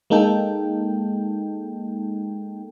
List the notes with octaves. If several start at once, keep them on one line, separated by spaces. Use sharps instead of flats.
G#3 A#3 D#4 A4 G5